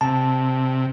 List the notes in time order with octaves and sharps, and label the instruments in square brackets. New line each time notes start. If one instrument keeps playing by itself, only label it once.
[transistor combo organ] C3 [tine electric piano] A5